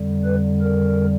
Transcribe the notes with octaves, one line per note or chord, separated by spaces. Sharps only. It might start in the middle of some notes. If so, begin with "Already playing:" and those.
Already playing: F2 D3 G3
B4
A#4